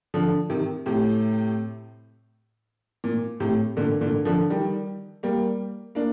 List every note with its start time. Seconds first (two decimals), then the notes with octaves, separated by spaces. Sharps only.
0.14 D3 F3
0.50 C3 D#3
0.86 A2 C3
3.04 A#2
3.40 A2 C3
3.77 A#2 D3
4.01 A#2 D3
4.25 D3 F3
4.50 D#3 G3
5.23 G3 A#3
5.95 A#3 D4